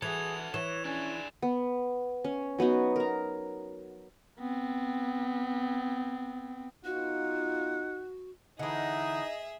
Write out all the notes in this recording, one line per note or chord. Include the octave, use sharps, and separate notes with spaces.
E3 F#4 G#4 A4 G#6 F7
E3 C#5 E7
C#4 D4 G#4
B3
C#4
F#3 B3 D#4 F#4
A#4 A#5
B3 C4
B3 D#4 F4 F#4 F#5
D3 E3 D#4 G#4 D#5 E5